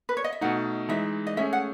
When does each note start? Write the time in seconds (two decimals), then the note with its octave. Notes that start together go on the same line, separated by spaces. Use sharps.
0.09 B4
0.17 C#5
0.24 D#5
0.33 E5
0.41 B2 A3 D#4 F#5
0.89 E3 G#3 D#4 E5
1.27 D#5
1.37 A3 C#4 G#4 E5
1.53 F#5